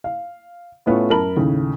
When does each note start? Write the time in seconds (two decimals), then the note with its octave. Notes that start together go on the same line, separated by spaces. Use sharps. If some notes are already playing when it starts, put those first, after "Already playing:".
0.04 F5
0.86 A2 A3 B3 C#4 F4
1.10 F#2 A#4 A5 B5 F#7
1.37 D#2 A2 C#3